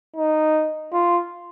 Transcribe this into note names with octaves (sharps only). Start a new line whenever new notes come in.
D#4
F4